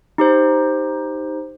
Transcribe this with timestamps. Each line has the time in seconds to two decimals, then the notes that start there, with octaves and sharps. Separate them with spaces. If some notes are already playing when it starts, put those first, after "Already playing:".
0.18 D#4 G4 C5